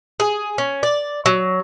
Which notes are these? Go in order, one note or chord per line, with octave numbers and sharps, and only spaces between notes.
G#4
C#4
D5
F#3